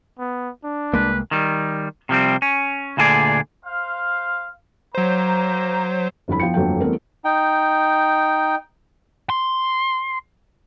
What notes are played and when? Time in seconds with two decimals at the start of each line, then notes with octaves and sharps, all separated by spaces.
0.19 B3
0.64 D4
0.93 C2 G#3 A#3 B4
1.31 D#3 G3
2.09 C3 F3 G3 C4
2.42 C#4
2.97 D2 A#2 D3 F#4 G#4 D5
3.65 C5 F5
4.95 F#3 A#3 C5 A#5
6.28 G1 F2 E4 B5
6.40 F3 B3 G5 C#7
6.54 G1 F2 F#3 A#3 A4 G5
6.81 E3 G3 A3 B3 C4 A#4
7.25 D#4 G5
9.30 C6